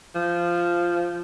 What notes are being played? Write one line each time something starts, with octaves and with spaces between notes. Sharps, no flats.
F3